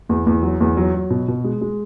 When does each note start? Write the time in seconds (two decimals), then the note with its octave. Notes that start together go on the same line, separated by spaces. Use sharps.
0.09 E2
0.27 E2
0.43 F#3
0.61 E2
0.77 F#3
0.94 F#3
1.10 B2
1.28 B2
1.44 G#3
1.61 G#3